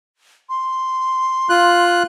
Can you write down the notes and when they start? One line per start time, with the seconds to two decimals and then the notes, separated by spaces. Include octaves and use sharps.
0.49 C6
1.50 F4 F#6